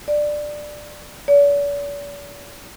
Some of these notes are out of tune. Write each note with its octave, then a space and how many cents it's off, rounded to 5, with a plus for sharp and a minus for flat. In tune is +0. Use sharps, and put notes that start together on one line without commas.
D5 +10
D5 -45